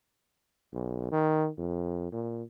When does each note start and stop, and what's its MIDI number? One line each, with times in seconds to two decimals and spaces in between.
0.73 1.08 35
1.12 1.48 51
1.58 2.11 41
2.12 2.43 46